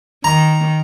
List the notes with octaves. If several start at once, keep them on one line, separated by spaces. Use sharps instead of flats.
D#3 A#5